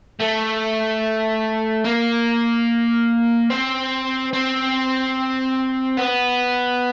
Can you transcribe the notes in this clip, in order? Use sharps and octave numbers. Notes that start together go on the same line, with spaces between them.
A3
A#3
C4
C4
B3